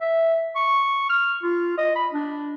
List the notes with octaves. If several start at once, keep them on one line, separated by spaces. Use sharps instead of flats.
E5
C#6
F6
F4
D#5
B5
D4